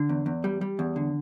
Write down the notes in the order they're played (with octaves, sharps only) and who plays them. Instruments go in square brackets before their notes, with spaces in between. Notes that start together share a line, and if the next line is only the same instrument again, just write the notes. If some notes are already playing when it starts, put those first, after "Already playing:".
Already playing: [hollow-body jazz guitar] D3
E2
E2
G3
G3
E2
D3